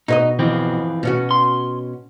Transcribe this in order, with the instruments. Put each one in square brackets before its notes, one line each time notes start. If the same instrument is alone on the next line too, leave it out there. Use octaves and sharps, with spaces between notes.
[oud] B2 C#5 D#5 [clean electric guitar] D#4
[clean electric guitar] E3 F3 C4
[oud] B2 C#4 F#4
[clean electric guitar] C6